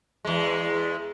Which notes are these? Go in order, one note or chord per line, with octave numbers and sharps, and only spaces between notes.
E2 G#3